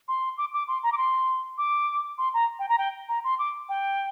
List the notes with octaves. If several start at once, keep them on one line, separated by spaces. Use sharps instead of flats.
C6
D6
D6
C6
A#5
D6
C6
D6
C6
A#5
G5
A#5
G5
A#5
C6
D6
G5